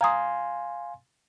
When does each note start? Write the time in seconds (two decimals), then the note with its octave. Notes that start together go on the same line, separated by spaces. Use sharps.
0.01 F5 G#5 A#5 C6 D#6